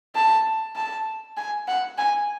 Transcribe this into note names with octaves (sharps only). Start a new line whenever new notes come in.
A5
A5
G#5
F#5
G#5